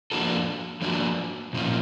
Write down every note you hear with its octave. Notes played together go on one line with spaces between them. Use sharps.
F3 A#3 D4 F#4 A4
F3 A#3 D4 F#4 A4
A#2 F3 A#3 C#4 F4